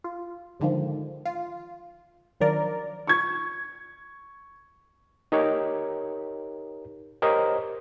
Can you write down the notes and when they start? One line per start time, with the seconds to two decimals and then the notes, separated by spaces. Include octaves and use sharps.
0.04 F4
0.60 G#2 D3 D#3 F3
1.25 F4
2.40 D#3 F3 F#3 D4 A#4 D5
3.07 C#6 G#6
5.32 D#4 G4 A#4 C#5
7.22 G4 A#4 C5 C#5 D#5